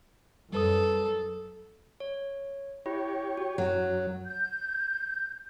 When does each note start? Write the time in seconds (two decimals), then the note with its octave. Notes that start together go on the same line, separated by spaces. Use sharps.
0.53 F#2 G3 A4 B4 D#6
2.00 C#5
2.86 E4 G4 C#5
3.37 F#4
3.58 F#2 F#3
4.26 G6